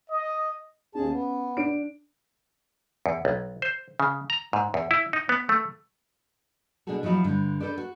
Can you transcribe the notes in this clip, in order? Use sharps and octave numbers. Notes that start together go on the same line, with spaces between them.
D#5
D#2 C#4 G#4 A5
B3
D4 D7
E2
B1
C5
C#3
A#5
G#2
E2
E4
D#4
B3
A3
B2 D4 E4 F#4 G#4 A4
F3 F#3 D#4 E4 F#4
G2 D3
D4 E4 A4 B4 C5 D5
F#4